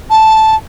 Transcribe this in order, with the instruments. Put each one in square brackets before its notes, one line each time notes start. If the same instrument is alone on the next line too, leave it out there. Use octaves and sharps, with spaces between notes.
[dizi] A5